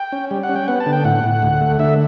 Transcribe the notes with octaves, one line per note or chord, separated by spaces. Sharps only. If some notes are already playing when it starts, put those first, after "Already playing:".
Already playing: G5
C#4
G3
F#5
C#4
G5
B3 F#5
A5
D3
G5
A2 F#5
A2
D2
A3
D3 E5